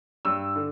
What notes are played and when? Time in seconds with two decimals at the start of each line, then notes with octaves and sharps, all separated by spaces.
0.25 G2 E6
0.56 D3